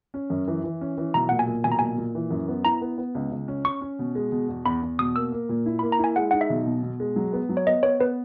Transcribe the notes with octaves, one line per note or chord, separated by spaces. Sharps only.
C#4
F#2
E3
E3
C#4
E3
B1 A#5
A#2 F#5
G#5
A#2
B1 G#5
A#5
A#2 G#5
A#2
E3
F#2
B3
E4 A#5
B3
B3
C#2
C#2
C#4
C#4 C#6
C#4
B2
G#3
B2
E2
E2 B5
E2
B2 D#6
A#3 E6
A#3
A#2
E4
A#3 B5
A#5
E4
G#5
G#3 F#5
D#4 F#5
E5
B1
B2
B2
G#3
F#3
B3
F#3
C#5
B3 D#5
B3 C#5
B3 B4